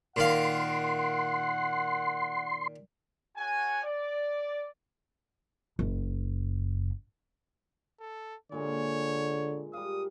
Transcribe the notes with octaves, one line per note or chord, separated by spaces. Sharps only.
A#2 D#3 F5 F#5 C6
F#4 A4 C#5 F#5 G#5
D5
F#1
A4
A#2 D3 G#3 A#4 C#5
G3 F5 D#6